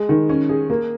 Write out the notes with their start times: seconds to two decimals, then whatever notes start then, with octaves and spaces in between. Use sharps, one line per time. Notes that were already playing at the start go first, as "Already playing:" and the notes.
Already playing: G#3
0.09 D#3
0.29 C#4
0.49 G#4
0.70 A#3